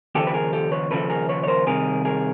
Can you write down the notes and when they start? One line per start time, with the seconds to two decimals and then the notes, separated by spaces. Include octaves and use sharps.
0.15 D#2 C#3 F3 G4 A4
0.27 B4
0.34 G#4 A#4
0.53 G4 A4
0.72 B4 C#5
0.91 D#2 C#3 F3 A4 B4
1.10 G#4 A#4
1.29 B4 C#5
1.44 C#5
1.47 A#4 C5
1.67 C2 C3 D#3 G#4 A#4
2.05 G#4 A#4